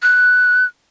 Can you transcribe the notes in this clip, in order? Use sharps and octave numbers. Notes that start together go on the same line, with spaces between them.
F#6